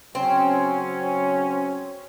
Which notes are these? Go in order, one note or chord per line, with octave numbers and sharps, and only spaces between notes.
C#3 F#3 C4 C#4